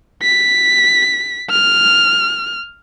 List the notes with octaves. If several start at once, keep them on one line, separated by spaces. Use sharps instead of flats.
B6
F6